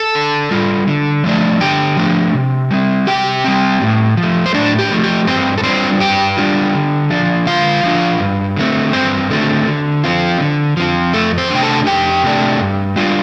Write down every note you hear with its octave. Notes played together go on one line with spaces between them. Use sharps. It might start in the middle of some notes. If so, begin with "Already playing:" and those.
Already playing: A4 A5
D3
G3 F4
D3
F3 A3 D4
D3 G4 G5
F3 A3 D4
C3
G3 C4
C3 G4 G5
G3 C4
A2
F3
A3
C5
A2 D4 D5
G4
F3 A3
G4
G2 C4 C5
A4
G3 C4 D4 F4 C5
G2 G4 G5
G3 D4 F4
D3
F3 D4 F4
D3 F4 F5
F3 D4 F4
G2
D3 A3 C4
G2 C4 C5
D3 A3 C4
D3
F3 C4 F4
D3
F3 C4 F4
F2 A3 A4
C4 C5
C3 A3 D4 G5
A4 A5
F2 G4 G5
C3 A3 D4
G2
G3 D4 F4